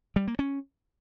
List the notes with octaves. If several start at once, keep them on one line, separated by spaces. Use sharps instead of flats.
G3
A#3
C#4